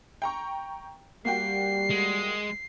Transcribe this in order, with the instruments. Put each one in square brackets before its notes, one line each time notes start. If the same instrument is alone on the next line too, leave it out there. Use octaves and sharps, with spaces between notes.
[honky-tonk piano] G5 A#5 C#6
[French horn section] G3 [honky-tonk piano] A#3 F#4 G5 [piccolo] C7
[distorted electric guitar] G#3